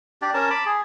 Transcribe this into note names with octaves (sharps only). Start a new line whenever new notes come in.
D4 G4 D5
C#4 A#4 A5
A5 B5 D6
G#4